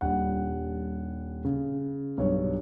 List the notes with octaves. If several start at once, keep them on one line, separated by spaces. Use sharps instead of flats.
D#1 G3 D4 F#5
C#3
B1 G2 C#5